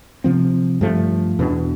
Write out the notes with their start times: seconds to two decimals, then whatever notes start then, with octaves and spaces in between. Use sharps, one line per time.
0.24 C3 F3 C4
0.81 G2 F3 A3
1.39 E2 B2 B3 D4